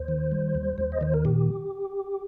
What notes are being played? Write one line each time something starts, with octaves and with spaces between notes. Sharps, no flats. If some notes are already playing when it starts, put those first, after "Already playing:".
Already playing: D#2 C5
D#3
G3
D#2
D#2
D#5
D#3 C5
A#4
A#2 G4